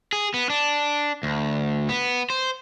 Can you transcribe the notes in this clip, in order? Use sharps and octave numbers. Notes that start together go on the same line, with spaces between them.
G#4
B3
D4
D2
B3
C5